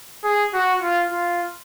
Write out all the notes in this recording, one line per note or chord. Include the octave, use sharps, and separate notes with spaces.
G#4
F#4
F4
F4